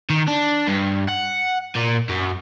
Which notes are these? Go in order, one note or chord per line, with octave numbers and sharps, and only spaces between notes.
D#3
D4
G2
F#5
A#2
F#2